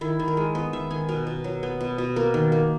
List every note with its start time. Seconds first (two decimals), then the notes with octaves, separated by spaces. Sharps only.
0.01 D#3 E4
0.19 D#3
0.28 A#4
0.37 G#3
0.55 B3 D#5
0.73 D#3 E5
0.91 D#3 G#5
1.09 B2 A#4
1.27 B2
1.44 F#3
1.63 B3
1.81 B2
1.98 B2
2.16 A#3 A#4
2.34 D#3
2.52 A#3